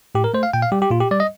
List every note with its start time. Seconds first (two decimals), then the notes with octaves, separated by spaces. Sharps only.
0.15 A2 G4
0.24 A#4
0.34 A3 C5
0.43 F5
0.53 A#2 G5
0.62 F5
0.72 G3 G4
0.82 G4
0.91 A#2 F4
1.01 G4
1.11 G3 D5
1.20 D#5